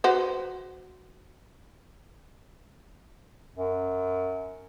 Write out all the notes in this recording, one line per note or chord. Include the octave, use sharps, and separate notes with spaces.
F#4 B4 C5
F#2